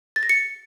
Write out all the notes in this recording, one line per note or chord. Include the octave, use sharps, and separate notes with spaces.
A6
A#6
C#7